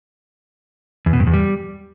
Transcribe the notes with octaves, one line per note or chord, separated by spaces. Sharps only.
E2
B2
G2
E2
G3